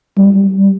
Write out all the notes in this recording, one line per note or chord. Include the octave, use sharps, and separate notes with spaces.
G3